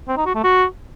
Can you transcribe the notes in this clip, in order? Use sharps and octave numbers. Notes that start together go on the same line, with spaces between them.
C4
D#4
F#4
A3
F#4